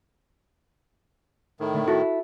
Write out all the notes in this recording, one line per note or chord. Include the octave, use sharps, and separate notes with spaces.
A2 D#3
D3 A3
E4 F#4 A4